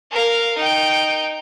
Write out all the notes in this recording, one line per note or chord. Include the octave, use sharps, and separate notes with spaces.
A#4 F5
D#4 G5